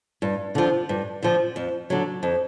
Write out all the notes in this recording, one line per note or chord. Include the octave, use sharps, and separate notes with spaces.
G2
D3 F3
G2
D3 F3
F2
D3 F#3
F2